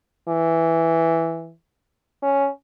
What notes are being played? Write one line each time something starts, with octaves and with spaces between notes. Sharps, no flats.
E3
C#4